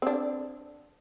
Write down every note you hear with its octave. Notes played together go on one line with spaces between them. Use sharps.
C4 D4